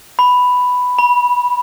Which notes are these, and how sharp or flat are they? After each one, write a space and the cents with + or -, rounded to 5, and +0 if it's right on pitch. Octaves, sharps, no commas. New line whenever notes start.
B5 +5
B5 -20